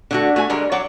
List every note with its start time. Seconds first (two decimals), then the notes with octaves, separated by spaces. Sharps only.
0.11 D3 A3 F#4
0.36 A3 F#4 G#5
0.50 D3 G3 G#3 A#4
0.72 F#3 D5 F#5